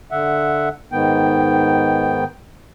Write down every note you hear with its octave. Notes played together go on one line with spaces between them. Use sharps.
D3 E5 F#5
G#2 D#3 B3 G5